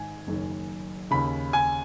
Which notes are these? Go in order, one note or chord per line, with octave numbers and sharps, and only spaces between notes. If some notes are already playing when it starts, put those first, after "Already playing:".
Already playing: G#2 D#3 G#5
F#1 F#2 D#3
D#2 C#3 B5
G#5